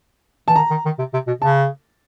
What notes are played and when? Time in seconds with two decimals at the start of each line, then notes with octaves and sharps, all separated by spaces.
0.48 E3 A5
0.56 D#3 A#5
0.70 D#3
0.85 D#3
0.99 C3
1.13 C3
1.27 B2
1.41 C#3 A5